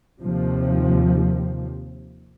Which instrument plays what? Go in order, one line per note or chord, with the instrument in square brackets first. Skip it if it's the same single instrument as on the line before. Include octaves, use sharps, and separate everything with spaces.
[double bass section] D#2 C3 F3